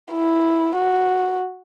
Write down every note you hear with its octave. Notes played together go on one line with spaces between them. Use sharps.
E4
F#4